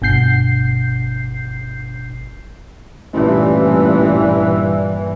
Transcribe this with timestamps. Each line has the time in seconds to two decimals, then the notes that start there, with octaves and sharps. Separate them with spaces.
0.02 G1 B2 G6 C7
3.14 A1 G2 A#2 E3